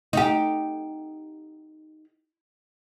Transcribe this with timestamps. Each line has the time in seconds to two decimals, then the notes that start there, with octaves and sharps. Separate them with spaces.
0.13 D#4 G4